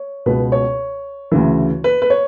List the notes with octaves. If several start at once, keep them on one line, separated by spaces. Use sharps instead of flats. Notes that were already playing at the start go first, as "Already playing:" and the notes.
Already playing: C#5
C#2 B2 B4
C#5
D2 C#3 E3
B4
B4
C#5